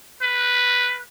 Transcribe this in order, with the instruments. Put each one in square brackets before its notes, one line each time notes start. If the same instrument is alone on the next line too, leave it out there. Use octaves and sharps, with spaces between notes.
[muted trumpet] B4